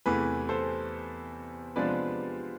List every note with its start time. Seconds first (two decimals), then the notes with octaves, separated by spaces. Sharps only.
0.06 E2 C3 E3 A3 G#4 B4
0.49 A4 C5
1.76 C3 F3 G#3 B3 D4 B4 D5